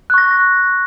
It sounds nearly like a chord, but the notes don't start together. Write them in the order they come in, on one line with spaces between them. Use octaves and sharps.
F#6 C#6 A#6